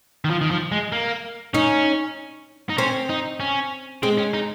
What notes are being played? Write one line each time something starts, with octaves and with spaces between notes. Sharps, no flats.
D#3
F3
D#3
F3
G#3
A#3
C#4 D#4
D#4
C4 C#4
D#4
C#4
G#3 C4
C#4
D#4